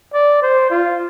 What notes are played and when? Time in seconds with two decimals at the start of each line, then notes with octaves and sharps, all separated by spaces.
0.14 D5
0.42 C5
0.70 F4